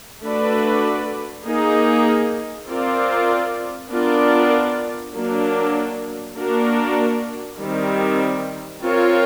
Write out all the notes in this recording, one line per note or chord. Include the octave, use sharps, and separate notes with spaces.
A3 D4 F#4 B4 D5
A#3 D#4 G#4
C4 F4 A#4 D5
B3 D4 F4 A#4 D5
F#3 A#3 D4
A#3 D4 F#4 A#4
D#3 G3 C4
C4 F4 A#4 C#5